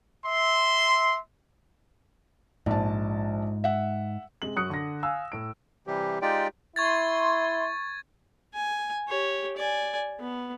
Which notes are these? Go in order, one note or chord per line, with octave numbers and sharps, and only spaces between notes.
E5 C6
A#1 G#2 A5
E5 F#5
C3 G#3 F#7
F#2 F#4 D#6 F#6 C#7
D3 A#6
F5 G#5 E6
A2 D7
C3 E3 G3 G4
G#3 D#4 F4 G4 D5 G5
E4 C6 C#6 G#6 A6
G#5
G4 C#5
D5 G#5
B3